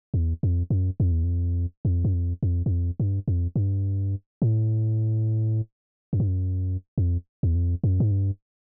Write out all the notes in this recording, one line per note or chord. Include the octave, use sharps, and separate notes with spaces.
E2
F2
F#2
F2
E2
F2
F2
F#2
F2
F2
F#2
F2
G2
F2
G2
A2
F#2
G2
F#2
F2
E2
F2
F#2
G#2
G2